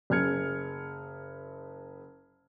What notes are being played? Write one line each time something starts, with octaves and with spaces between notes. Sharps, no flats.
F#1 G#4 F6 G#6 C#7